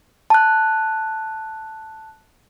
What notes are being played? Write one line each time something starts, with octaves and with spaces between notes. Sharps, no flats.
A5 F#6